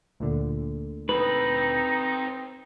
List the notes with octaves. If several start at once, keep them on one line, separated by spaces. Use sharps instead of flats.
D2 A#2 D3
C4 D#4 A4 B4